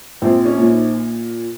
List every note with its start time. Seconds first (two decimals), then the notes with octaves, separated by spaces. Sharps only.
0.22 A#1 C4
0.45 C#4
0.58 A#2
0.70 D#4